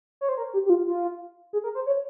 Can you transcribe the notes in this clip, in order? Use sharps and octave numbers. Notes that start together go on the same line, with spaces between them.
C#5
C5
A#4
G4
G4
F4
F4
G#4
A#4
C5
C#5